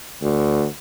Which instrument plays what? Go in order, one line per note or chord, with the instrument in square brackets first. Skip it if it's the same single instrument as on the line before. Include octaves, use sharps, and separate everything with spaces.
[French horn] D2